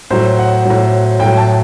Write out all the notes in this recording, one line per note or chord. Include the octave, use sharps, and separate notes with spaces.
A2 F#3 C5
F#5
A2 F#3
A2 F#3 G5
A5